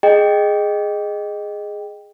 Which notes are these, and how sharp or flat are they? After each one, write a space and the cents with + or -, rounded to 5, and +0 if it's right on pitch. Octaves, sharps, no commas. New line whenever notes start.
G#4 +0 D#5 -10 G5 +0